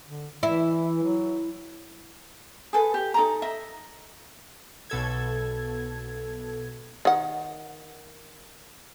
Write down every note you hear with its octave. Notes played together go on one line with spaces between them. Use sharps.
D3
E3 E4
F#3
G#4 A4 B4
G4
D#4 A4 A#5
D#5 E5
B1 B2 A4 G#6
D#3 F#5